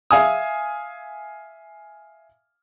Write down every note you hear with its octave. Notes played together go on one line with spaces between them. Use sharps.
E5 F5 G#5 D#6